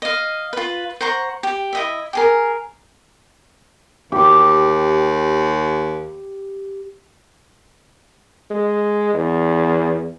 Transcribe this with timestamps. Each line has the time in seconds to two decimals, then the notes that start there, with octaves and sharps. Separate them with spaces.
0.02 D#5 F5
0.53 F4 B4
1.01 C5 F#5 A#5 C#6
1.43 G4
1.73 E4 D#5 E5
2.13 G4 G#4 A#4
4.12 D#2 G4
8.50 G#3
9.14 E2